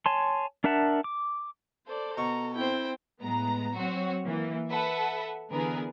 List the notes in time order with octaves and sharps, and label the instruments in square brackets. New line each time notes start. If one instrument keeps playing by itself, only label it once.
[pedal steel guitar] C#5 G#5 A5 C6
D4 A#4 E5 F#5 A5
D6
[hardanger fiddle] A4 [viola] C5 D5
[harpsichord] B2 C#6 [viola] A#5
[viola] C4 E4 [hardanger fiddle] C5 G5
[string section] A2 G#3 B3 A#5
F#3 C4 F#4 C#5
E3 A#3
A4 B4 E5 F#5
D3 E3 B3 G#4 A#4 B4